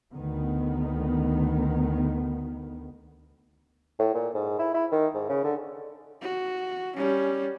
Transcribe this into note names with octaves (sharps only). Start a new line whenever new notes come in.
D2 D#3 B3
A2
A#2
G#2
E4
E4
D#3
G#2
C#3
D3
F#4
G3 C#4